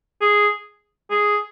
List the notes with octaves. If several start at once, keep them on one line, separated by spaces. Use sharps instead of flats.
G#4
G#4